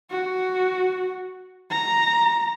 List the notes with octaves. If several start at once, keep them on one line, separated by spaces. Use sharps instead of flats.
F#4
A#5